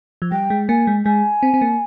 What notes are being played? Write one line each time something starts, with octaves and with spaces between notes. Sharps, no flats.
F3
G3 G5
G#3
A#3 G#5
G#3
G#3 G#5
C4
C4
A#3